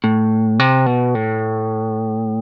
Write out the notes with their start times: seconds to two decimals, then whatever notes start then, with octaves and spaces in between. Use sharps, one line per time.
0.04 A2
0.60 C3
0.86 B2
1.15 A2